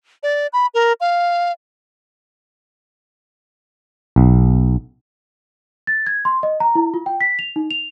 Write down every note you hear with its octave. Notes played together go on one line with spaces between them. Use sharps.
D5
B5
A#4
F5
B1
A6
G#6
C6
D#5
A#5
E4
F4
G5
B6
F7
D#4
F7